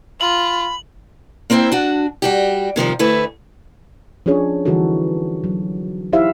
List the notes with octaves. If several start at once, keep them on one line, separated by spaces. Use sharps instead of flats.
F4 B5 F#7
A#3 C4 E4 C5 G5
D4 F#4
G3 F#4 G4
C3 D#3 F3 G3
D2 A3 E4 B4
F3 C#4 D4 G#4 C#5
D3 E3 G3 D#4 F#4 A4
F#3
D#4 E4 G4 C5 E5 F5